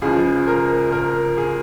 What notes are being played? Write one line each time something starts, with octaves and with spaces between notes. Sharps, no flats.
C#2 C#3 F3 G#4
A#4
A#4
G#4